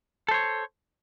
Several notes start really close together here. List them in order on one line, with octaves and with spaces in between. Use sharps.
A4 C5 C#5